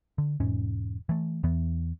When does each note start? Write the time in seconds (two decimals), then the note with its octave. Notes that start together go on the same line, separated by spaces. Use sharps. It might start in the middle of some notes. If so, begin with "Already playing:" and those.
0.18 D3
0.40 E1 G#2 C#4
1.09 E3 A3
1.43 E2 E3 B3